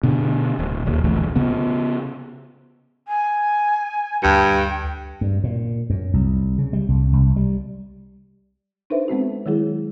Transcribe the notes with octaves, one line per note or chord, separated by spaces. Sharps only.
B2 D3
D1
D#1 D#2
D#1 A1 D2
C#3 B3
G#5
D2 G2 G5 C#7
G2
A#2
F#2
C2
C#3
G3
C2
C2
G3
D4 D#4 A4 B4 C5 E5
G#3 B3 C4 F#4
D#3 F#3 G#3 E4 G#4